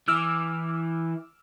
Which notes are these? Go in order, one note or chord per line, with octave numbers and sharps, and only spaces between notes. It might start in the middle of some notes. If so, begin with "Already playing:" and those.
E3 D6 E6 F6